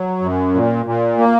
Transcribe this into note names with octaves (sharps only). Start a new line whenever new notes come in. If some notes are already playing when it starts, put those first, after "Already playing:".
Already playing: F#3
F#2
A#2
A#2
A#3